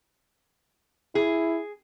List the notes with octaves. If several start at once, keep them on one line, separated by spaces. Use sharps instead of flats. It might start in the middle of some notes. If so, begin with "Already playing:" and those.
E4 G#4